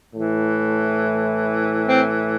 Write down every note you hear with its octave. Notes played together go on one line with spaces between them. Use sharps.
A2 E3
C4